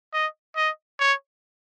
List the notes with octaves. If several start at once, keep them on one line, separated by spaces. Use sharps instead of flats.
D#5
D#5
C#5